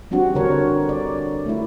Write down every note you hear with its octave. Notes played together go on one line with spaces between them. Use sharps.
G3 C4 D4 F#4
D3 A#4 C#5
D5
A3 E4